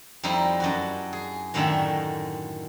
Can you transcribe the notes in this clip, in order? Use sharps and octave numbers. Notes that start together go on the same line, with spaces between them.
F2 G3 D#4 E4 D#5 A#5
F#2 D4 F#4
G#4
F#2 A2 D3 D#3 E5 G5